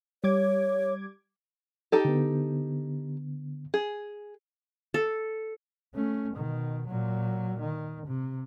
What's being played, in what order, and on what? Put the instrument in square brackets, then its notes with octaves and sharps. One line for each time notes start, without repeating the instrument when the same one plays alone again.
[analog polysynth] G3 D6 G#6 [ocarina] C#5
[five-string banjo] D#4 G4 A4
[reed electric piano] D3 B3
[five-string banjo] G#4
[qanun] A4
[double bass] A3 C#4
B2 D#3
A#2 F#3
D#3
C3